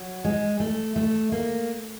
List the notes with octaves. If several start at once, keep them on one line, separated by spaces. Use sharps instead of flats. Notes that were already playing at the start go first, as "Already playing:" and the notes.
Already playing: F#3
G#3
A3
A3
A#3